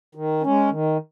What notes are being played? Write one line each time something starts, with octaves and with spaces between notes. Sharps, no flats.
D#3
G#3 C#4
D#3